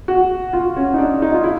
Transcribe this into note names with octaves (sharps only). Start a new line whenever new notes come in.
F#4
F4
C#4
D#4
D4
D#4
F4
E4